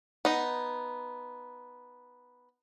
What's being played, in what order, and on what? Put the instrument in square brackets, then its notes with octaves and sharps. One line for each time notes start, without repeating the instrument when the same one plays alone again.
[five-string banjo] B3 D#4